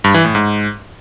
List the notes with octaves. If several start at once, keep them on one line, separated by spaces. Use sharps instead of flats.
G2
E3
A2
G#2